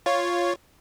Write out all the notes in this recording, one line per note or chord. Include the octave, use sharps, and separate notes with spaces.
F4 C#5